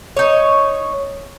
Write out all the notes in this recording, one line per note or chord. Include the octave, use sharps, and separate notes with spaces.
D#4 C#5